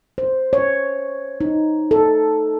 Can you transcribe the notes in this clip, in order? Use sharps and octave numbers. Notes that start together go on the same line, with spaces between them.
C5
C#5
D#4
A4